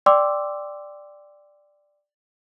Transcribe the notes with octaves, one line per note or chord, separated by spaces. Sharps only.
D5 G5 C6 D6 E6